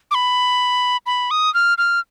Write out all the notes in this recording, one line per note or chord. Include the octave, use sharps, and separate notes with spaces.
D6
B5
B5
D#6
F6
F6